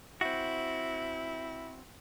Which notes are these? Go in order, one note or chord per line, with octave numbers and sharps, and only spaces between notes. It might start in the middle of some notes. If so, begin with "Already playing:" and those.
C4 E4 F#4